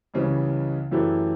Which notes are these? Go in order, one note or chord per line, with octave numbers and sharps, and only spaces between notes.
C#2 C#3 E3 G3 C#4
F#2 E3 A3 E4 G4